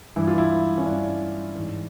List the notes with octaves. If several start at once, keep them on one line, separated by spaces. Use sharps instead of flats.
G2 E3 E4
F4
E4
C#4
G2 E3 D4
G#2 E3